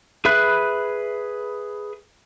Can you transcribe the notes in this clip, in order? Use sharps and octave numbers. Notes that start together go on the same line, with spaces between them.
G#4 B4 E5 B5 F#6